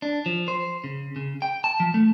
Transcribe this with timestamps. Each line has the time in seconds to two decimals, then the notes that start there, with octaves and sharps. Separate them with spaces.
0.02 D4
0.26 F3
0.48 C5
0.84 C#3
1.16 C#3
1.42 G5
1.64 A5
1.80 F3
1.94 A3